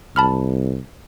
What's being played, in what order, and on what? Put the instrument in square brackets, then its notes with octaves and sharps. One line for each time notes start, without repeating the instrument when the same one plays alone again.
[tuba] C2 [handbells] A5 B5 F6